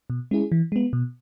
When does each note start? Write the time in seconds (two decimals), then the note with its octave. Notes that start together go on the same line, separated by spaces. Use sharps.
0.10 B2
0.31 G#3 C#4 E4 G#4
0.52 E3
0.72 G#3 B3
0.93 B2